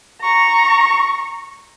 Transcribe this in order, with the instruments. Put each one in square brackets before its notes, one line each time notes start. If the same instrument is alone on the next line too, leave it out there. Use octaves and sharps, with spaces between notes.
[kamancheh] A#5 C#6